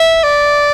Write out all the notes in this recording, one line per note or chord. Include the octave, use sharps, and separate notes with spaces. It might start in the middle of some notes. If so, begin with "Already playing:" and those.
Already playing: E5
D5